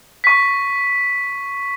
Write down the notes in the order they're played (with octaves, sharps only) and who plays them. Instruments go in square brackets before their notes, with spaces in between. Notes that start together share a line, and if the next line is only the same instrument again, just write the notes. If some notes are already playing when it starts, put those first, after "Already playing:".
[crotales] C#6 B6